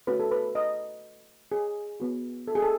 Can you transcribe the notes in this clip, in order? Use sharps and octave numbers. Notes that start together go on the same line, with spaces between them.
A3 C#4 F#4 B4
A4
B4
D#5
G#4
B3 F#4
A4
G#4
A4